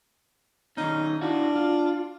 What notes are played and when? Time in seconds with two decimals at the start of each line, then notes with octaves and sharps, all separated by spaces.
0.77 D#3 C#4 D#4
1.21 D4 E4 F#4
1.56 F4